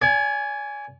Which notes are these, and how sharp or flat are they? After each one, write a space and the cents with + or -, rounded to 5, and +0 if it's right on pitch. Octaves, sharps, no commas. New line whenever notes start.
D5 -45 G#5 +0